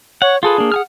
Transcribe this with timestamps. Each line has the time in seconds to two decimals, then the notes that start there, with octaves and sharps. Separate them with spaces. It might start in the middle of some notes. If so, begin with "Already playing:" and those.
0.22 C#5 F#5
0.43 F4 G#4 A4 B4
0.58 A#3 D4
0.72 F#5 G#5 F6